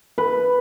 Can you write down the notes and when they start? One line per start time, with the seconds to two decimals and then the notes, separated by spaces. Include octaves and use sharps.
0.18 B4